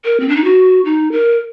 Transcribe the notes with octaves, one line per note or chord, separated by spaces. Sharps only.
A#4
C4
D4
D#4
F#4
D#4
A#4